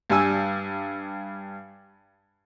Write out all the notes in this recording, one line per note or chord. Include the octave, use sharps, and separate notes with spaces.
G2 G3 G#5 E6